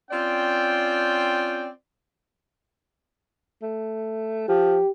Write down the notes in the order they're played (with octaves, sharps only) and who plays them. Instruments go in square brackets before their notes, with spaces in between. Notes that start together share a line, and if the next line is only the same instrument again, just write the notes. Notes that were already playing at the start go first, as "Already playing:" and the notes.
[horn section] C4 C#4 F4 D5 G5
[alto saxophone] A3
[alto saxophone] F3 [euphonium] G4